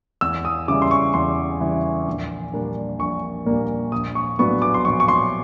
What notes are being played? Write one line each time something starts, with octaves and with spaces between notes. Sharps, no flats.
E2 E6
D#6
C#3 E3 G3 D6
C6
C#6
E2 C6
C#3 E3 G3
A#1
A#2 G3 A#3 D4
A#1 C#6
A#2 G3 A#3 D4
A#1 D#6
C#6
A2 F#3 B3 D4 C#6
D6
C6
A#1 C#6
C#6
C6